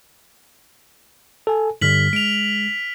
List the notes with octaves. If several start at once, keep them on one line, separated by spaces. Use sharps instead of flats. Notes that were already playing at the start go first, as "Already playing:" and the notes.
A4 G#5
G2 D3 G3 F6 B6 F#7
G#3 D7 F7